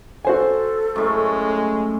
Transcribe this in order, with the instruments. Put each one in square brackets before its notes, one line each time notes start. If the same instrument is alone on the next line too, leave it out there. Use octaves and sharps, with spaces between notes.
[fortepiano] F#4 C5 G#5 [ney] A4
[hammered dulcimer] F#2 A2 A3 [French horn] G#3